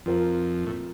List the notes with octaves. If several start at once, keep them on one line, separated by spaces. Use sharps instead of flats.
F2 F3 C4 F4 A#4
A2